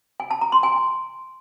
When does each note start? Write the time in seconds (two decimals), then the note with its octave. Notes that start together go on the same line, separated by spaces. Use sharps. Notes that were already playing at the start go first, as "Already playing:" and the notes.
0.20 G#5
0.31 A5
0.41 A#5
0.52 C6
0.63 G#5